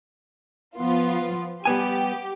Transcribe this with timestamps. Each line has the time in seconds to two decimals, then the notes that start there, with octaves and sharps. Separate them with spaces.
0.76 F3 B3 F4
1.65 G3 B3 G4 G#5